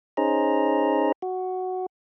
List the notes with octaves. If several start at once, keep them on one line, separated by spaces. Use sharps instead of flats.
C#4 D#4 G#4 C5 A#5
F#4